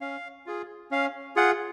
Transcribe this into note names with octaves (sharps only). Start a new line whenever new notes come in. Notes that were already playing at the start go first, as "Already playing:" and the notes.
C#4 F5
F4 G#4
C#4 F5
F4 G#4 F#5